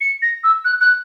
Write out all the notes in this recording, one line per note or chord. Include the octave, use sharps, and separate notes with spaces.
C#7
A#6
E6
F#6
F#6